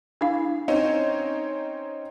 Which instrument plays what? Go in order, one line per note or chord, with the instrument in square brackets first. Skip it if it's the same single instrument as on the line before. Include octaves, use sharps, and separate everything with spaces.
[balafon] D4 E4 F5
[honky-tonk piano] C4 C#4 D#4